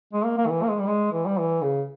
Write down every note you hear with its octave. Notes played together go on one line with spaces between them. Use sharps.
G#3
A#3
A#3
D#3
E3
A#3
G#3
G3
G#3
E3
G3
E3
C#3